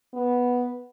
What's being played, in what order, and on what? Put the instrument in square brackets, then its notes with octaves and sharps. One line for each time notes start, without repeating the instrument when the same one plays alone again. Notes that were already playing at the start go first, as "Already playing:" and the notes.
[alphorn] B3